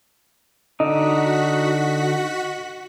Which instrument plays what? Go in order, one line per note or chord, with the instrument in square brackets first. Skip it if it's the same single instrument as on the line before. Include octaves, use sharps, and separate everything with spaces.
[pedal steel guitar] D3 D#4 [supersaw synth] F#4 F#5 B6 [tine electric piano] D#5